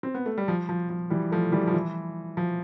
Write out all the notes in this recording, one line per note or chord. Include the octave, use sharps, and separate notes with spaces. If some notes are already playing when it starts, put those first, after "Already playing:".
C4
B3
A3
G3
F3
F3
F3
E3 G3
F3 A3
E3 G3
F3
E3
F3